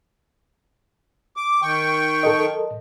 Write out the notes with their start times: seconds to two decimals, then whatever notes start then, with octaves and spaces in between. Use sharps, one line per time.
1.37 D6
1.62 D#3 G5 C#6
2.23 A4 A#4 D#5